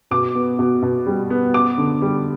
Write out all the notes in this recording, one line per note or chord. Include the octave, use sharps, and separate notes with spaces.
B2 D6
B3
B2
B2
G3
B3
B3 D6
D3
G3